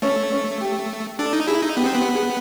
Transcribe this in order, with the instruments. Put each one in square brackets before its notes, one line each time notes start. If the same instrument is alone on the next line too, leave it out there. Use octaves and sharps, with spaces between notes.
[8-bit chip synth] A3 [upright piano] C#4
[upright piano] C#4
G4
[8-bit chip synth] D4 [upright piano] A4
[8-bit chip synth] D#4
[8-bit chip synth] E4 [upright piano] G#4
[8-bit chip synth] D#4
[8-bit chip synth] B3 [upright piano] G4
[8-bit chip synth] C4
[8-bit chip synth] B3 [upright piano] G4
[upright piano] G#4